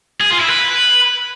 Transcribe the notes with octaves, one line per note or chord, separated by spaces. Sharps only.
G#4
F4
E4
B4